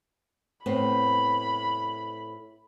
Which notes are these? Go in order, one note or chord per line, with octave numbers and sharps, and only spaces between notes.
A2 B3 C4 B5